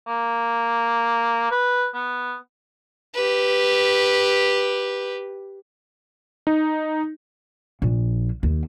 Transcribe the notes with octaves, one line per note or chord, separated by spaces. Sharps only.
A#3
B4
B3
G4 B4
D#4
A#1
D#2